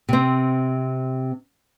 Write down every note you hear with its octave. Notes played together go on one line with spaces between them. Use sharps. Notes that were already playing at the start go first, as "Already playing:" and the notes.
C3 C4